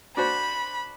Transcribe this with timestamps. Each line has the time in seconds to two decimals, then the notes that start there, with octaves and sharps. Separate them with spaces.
0.17 D4 F#4 C5 B5